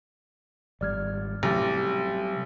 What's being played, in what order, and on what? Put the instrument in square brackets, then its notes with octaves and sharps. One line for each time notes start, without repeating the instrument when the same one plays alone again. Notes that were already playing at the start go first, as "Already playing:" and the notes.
[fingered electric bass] G#1 G3 [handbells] D5 F6 G#6
[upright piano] A1 [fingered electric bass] C3 F#3 G3 [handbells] G4